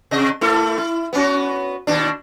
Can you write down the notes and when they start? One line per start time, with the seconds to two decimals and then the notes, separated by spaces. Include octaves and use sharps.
0.11 C3 D#5
0.41 A3 E4 A4
0.78 E4
1.13 B3 C#4 F#4
1.87 D#2 B2 D4